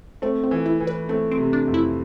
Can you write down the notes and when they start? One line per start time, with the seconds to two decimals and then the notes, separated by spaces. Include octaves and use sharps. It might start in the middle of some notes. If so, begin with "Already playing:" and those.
0.22 A3 C4
0.43 C4
0.51 E3
0.66 E4
0.80 E3
0.87 B4
1.09 A3 C4
1.32 C4
1.38 C3
1.53 D4
1.68 F2
1.74 E4